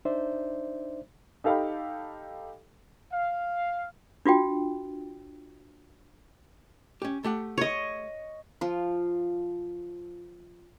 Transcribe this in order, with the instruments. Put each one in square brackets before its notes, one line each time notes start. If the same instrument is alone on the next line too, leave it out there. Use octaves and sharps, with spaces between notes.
[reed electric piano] D4 D#4 C5 D5 E5
[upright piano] D#4 G4 A4 F5 G5 B5
[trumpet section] F5
[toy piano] D4 F4 F#4 G5
[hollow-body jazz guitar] C#4 G4
A3 G4 F#5
[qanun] C#5 D#5
F3 F4